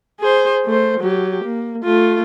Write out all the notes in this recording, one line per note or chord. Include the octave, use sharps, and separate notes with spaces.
G#4 C5
A3 C5
F#3 G4
A#3
A3 F4